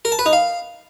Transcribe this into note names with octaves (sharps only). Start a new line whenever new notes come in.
A#4
A5
B4
D#4
F5